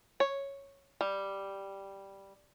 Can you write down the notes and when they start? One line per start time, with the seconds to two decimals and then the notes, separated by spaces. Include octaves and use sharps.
0.20 C#5
1.01 G3